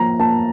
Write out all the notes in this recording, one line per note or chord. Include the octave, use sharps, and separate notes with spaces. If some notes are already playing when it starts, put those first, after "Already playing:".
Already playing: F3 A#3 A#5
A#3 A5